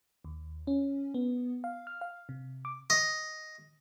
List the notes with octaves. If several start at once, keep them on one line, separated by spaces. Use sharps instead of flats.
D#2
C#4
B3
F5
F6
F5
C3
D6
D#5